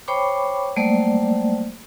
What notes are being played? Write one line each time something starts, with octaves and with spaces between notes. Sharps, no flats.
C5 C#5 G5 B5 C#6 D6
F#3 G3 A3 A#3 C5 D5